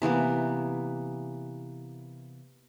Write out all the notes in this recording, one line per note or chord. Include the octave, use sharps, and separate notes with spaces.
C3 E3 A#3 B3